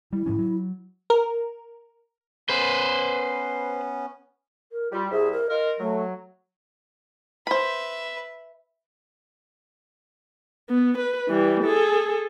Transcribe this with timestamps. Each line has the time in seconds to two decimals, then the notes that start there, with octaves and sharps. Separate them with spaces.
0.13 G3 E4
0.26 G#2 F3 C#4
0.38 F#3
1.10 A#4
2.49 B3 C#4 B4 C5
4.72 A#4
4.92 G3 F4
5.11 C2 G#4 E5
5.32 A#4
5.50 F4 A#4 D#5
5.79 F#3 A3
7.47 B4 C5 E5 B5
10.69 B3
10.98 B4
11.29 E3 G3
11.63 G#4 A4